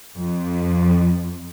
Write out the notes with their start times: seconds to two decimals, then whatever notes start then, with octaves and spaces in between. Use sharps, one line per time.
0.16 F2